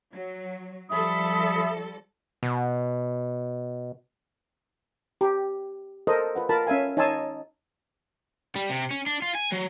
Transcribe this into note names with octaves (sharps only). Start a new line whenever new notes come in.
F#3
F3 G3 A4 E5 B5 D#6
B2
G4
A4 A#4 C5 D#5
F4 B4 F#5
F4 A#4 A5 B5
C#4 E5 F5 G#5
D#4 C#5 G#5 A5 C6 E6
G3
C3
C#4
D4
F4
G#5
F#3